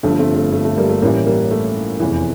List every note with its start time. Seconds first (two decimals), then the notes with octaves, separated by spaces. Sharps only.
0.03 G1 G2 D3 F3 A3
0.19 A3 C4
0.35 A3
0.52 A3
0.65 A3
0.77 G3 A#3
0.89 A3
1.02 A1 A2 E3 G3 A#3
1.26 G3 A#3
1.51 A3
2.00 F1 E2 E3